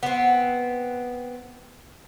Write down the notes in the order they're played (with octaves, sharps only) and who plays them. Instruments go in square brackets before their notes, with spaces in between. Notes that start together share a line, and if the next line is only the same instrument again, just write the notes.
[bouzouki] B3 C4